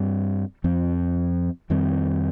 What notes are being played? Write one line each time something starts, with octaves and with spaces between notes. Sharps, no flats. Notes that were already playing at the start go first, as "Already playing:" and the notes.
Already playing: G2 G3 C4
F2 F3 C4
F2 D#3 G3 C4